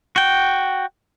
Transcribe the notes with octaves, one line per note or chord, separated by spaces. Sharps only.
F#4 G5